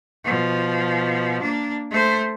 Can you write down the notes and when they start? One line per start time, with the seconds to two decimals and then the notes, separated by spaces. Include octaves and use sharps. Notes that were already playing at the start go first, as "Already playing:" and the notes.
0.24 B2 F3
1.42 A#3 D4
1.91 A3 C5